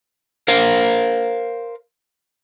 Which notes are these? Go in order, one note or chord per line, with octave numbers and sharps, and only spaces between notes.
A#4 C5 F5